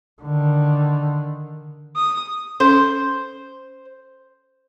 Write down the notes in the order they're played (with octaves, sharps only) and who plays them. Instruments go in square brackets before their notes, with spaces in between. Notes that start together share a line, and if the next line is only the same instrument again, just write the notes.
[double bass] D3 D#3
[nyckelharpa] D#6
[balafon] C#4 A4 [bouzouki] C5